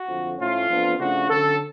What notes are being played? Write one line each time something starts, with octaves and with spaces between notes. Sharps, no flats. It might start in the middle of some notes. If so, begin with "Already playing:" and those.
Already playing: F#4
F2 D3 F3
A2 F3 A3 C#4 F4
F2 F3 B3 D4
C#3 F3 A3 D4 F#4
D3 F#3 C#4 A4